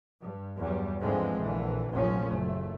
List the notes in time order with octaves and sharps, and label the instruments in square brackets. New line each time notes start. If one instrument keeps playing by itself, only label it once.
[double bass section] G2
E2 G2 F#3 G3
G#2 D3 E3 F3 G#3 C4
A#1 D3 E3
F1 A#1 A#2 F3 F#3 C#4
F#1 A3